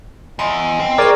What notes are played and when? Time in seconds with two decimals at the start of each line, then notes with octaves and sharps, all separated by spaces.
0.39 E2 D#5 C6
0.80 C4
0.98 G#4 A#4 D5 D#5 C#6